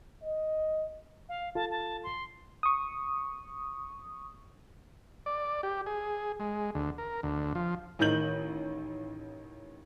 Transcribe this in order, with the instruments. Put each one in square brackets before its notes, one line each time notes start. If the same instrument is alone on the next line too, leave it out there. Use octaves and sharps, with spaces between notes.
[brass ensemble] D#5
[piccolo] F5
[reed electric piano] F4 A4 F5 [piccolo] A5
[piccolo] A5
C6
[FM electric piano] C#6 D#6
[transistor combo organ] D5
G4
G#4
G#3
D2
A#4
D2
F3
[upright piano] A1 D#3 D#4 G6 F#7